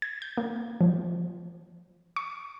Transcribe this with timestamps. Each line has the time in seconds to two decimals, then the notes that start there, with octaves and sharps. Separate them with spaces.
0.02 G#6
0.22 G6
0.37 A#3
0.81 F3
2.16 C#6